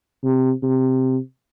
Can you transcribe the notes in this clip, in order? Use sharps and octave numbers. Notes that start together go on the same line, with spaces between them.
C3
C3